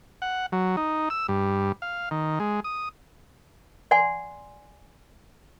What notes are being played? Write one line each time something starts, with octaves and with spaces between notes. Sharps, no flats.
F#5
F#3
D#4
E6
G2
F5
D#3
G#3
D#6
D5 F#5 G#5 C6